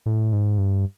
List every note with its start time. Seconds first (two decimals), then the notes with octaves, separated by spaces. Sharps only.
0.06 A2
0.32 G#2
0.58 G2